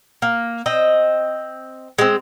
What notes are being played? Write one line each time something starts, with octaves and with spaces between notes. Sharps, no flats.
A#3
C4 D#5
G#3 C4